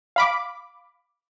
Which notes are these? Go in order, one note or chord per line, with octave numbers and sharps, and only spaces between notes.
F5 B5 D6